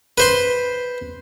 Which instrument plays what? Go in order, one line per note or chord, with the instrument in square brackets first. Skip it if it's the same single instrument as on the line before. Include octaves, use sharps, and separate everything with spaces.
[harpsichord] B4 C5 C6